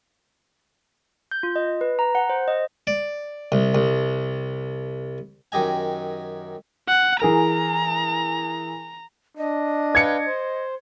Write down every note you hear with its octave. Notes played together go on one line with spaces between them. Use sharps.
G6
F4
D#5
B4
A#5
F#5
C5
D#5
D5
C2
C2
F#2 D#3 G4 D#5 G#5
F#5
E3 G#4 A#4 A#5
D4 D#5
B4 F5 G5 G#6 C#7
C5